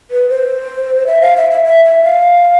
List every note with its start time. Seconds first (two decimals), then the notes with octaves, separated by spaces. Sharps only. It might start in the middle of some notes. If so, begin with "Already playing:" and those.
0.11 B4
0.29 C5
1.07 E5
1.21 F5
1.37 E5
1.51 E5
1.65 E5
1.85 E5
2.04 F5